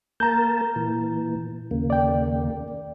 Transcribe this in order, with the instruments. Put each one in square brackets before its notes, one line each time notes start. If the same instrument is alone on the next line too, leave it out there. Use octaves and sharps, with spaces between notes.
[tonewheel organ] A#3 A#4 A5 [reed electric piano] A#5 G6
[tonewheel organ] A#2 E3
D#2 C#3 A#3
[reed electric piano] D5 G5